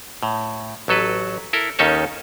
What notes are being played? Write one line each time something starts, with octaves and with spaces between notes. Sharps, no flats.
A2
A1 F#3 A4 B4
E4 A4 A#4
D#2 D#3 C#4 D#4 A4 C#5